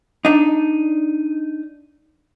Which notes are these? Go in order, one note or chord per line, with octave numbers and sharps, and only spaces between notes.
D4 D#4